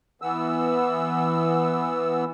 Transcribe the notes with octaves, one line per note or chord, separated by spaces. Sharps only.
E3 B3 E6